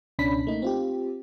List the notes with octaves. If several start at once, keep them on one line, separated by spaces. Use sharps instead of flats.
C#2 B2 C#4 D4 B5 B6
A3 A#3 D#4
C4 F4 G4